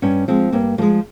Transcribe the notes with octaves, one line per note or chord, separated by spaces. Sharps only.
G2 C#4
F3 G#3 C4
G2 A#3
F3 G#3 A#3